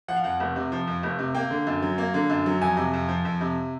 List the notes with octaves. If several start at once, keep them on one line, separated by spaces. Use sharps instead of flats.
F3 F#5
F5
F2 F#5
F1
C3
F3
F2
F1
C3
A#3 G5
D3
F#2
F#3
A#3
D3
F#2
F#3
F2 G#5
C3
F2
F3
F2
C3